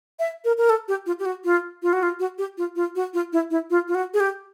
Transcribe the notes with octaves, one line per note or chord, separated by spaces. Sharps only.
E5
A#4
A#4
A4
G4
F4
G4
F#4
F4
F4
F#4
F4
F#4
G4
F4
F4
F#4
F4
E4
E4
F4
F4
F#4
G#4
G4